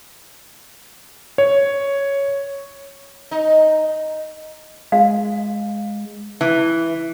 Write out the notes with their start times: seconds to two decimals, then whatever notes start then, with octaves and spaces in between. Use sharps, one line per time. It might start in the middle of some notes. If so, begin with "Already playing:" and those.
1.38 C#5
3.31 D#4
4.92 G#3 F5
6.41 E3